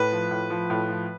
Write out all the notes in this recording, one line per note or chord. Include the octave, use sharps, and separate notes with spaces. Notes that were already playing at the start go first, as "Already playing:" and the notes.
Already playing: A2 B4
F3
A2
F3
A2
F3